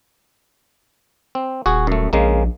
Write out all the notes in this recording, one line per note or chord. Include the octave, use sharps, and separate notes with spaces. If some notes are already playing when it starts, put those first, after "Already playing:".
C4
D#1 F#4 G#4
F#2 A3
A#1 C#3 G#3 A#3